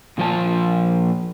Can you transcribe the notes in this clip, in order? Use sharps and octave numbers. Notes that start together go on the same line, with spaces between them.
A#2 F3 A#3 C5 A5